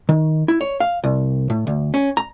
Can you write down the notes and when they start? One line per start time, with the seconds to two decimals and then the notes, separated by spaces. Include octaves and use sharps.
0.09 D#3
0.48 E4
0.61 C#5
0.80 F5
1.04 C2
1.50 A2
1.67 D2
1.94 C#4
2.17 A#5